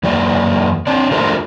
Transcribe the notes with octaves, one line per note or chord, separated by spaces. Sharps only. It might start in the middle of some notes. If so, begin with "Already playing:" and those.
F#2 E3 A#3 F#4 D5
C4 D4 D5
A3 D4 F4 F#4 A#4 C5